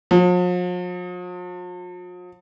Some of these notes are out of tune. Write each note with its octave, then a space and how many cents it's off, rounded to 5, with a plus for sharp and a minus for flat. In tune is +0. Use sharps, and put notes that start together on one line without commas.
F3 +45